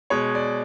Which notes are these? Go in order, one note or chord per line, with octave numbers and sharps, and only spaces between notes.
B2 G#3 C#5
D5